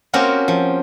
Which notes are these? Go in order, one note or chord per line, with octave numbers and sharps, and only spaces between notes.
A#3 C4 C#4 F#4 G4 A#4
F3